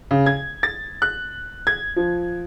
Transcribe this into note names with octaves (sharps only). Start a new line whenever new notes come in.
C#3
G#6
A6
F#6
G#6
F3